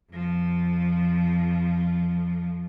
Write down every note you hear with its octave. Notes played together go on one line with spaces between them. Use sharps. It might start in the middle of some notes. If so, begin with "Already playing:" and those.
F2 F3